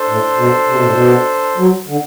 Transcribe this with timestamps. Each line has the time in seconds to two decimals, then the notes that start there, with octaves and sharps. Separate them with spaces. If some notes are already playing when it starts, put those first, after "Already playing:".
Already playing: D4 A4 C5
0.09 A2
0.38 B2
0.69 C3
0.76 B2
0.85 A2
0.93 B2
1.58 F#3
1.88 D3